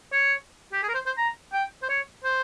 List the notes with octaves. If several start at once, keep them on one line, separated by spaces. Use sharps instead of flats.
C#5
G4
G#4
A#4
C5
C5
A#5
G5
C5
C#5
C5